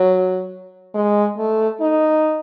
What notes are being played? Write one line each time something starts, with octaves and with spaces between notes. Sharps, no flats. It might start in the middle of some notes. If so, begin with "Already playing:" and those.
Already playing: F#3
G#3
A3
D#4